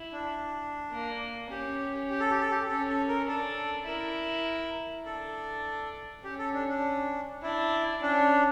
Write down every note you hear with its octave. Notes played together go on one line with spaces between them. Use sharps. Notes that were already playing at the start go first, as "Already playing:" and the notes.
Already playing: E4
D4
A#3
C#4 G4
G4
A4
G4
A4
G4
C#4 A4
A4
A#4
D4 A4
E4 A#4
D4 A4
C#4 G4
A4
D4
D4
D4 E4
C#4 D4